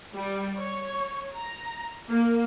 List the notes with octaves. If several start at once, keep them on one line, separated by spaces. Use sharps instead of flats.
G3
C#5
A#5
A#3